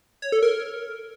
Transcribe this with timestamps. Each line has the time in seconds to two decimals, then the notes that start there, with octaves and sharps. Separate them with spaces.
0.22 C#5
0.32 A4
0.43 A#4